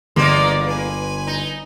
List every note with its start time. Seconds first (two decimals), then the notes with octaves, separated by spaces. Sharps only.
0.16 G1 E2 A#3 D5 D#5 A#5 C6
0.64 B4 G#5
1.27 D#4